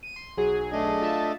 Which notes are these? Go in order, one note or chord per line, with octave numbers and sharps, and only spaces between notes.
D#7
C6
B1 F#3 G#4
A3 D4 D#5
F4 E5 A5